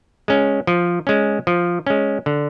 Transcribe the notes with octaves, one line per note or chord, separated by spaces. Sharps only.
G#3 C#4
F3
G#3 C#4
F3
G#3 C#4
D3